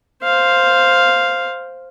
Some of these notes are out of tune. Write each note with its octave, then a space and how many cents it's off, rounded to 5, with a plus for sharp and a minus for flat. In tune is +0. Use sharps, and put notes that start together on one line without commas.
C5 +0 F5 +0